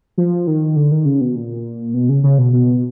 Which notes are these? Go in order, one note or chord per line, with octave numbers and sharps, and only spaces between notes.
F3
D#3
D3
D#3
C#3
B2
A#2
B2
C#3
C#3
B2
B2